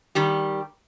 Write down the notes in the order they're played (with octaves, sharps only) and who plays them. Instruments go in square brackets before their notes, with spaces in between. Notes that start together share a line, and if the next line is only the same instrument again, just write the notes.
[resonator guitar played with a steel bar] D#3 G3 G4